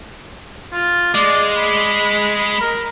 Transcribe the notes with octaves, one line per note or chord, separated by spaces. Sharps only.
F4
G#3 D5
B5
A#4